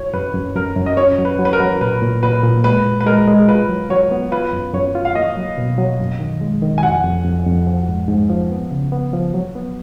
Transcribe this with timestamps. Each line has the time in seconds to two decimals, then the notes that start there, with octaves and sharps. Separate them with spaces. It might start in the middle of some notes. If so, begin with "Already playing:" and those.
Already playing: C#5
0.14 F#2 B4
0.35 F#2
0.56 F#2 A#4
0.76 F#2
0.86 D#5
0.97 C#4 C#5
1.18 F#3
1.25 B4
1.39 F#3
1.45 B4
1.53 A#4
1.60 F#3
1.81 A#2 B4
2.02 A#2
2.23 A#2 B4
2.44 A#2
2.64 G#3 B4
2.86 A#2
3.01 B4
3.06 G#3 A#4
3.27 G#3
3.48 F4 B4
3.69 F#3
3.90 F#3 C#5
4.11 B3
4.32 F4 B4
4.53 F#2
4.74 F#2 C#5
4.95 F4
5.05 F5
5.15 A#3 D#5
5.37 F#3
5.58 B2
5.78 F#3
6.00 F#2
6.20 D#3
6.41 G#3
6.62 D#3
6.78 G#5
6.83 F2 F#5
7.04 F2
7.25 F2
7.46 F2
7.67 F3
7.88 G#2
8.08 G#2
8.30 F3
8.51 B3
8.71 C#3
8.92 B3
9.13 F3
9.34 F#3
9.55 B3